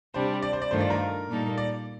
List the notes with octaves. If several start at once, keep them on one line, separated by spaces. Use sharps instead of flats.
C3 G3 D4 C5
D5
C5
D5
G2 D#3 A3 D4 F4 C5
D5
A#4
A#2 G3 A#3 D#4 A4
D5